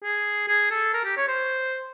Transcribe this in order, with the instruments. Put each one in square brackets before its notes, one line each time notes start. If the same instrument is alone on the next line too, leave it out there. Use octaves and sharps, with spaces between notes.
[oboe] G#4
G#4
A4
A#4
G4
C#5
C5